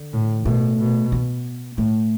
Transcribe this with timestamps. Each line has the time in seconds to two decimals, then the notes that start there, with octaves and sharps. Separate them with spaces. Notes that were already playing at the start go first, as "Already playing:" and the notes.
Already playing: D3
0.13 A2
0.45 B2 A3
0.79 B2
1.12 B3
1.77 A2 A3